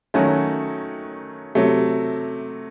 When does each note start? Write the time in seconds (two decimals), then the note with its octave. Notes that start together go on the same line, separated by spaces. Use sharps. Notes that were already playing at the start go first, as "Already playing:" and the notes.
0.14 D#3 F#3 A3 C#4 F#4
1.55 C3 F#3 A3